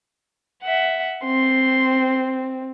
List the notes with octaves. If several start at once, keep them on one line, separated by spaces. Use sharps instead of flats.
E5 F#5
C4 C6